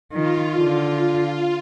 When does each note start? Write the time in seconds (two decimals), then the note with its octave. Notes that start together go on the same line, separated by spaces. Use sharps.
0.12 D#3 F4
0.58 D3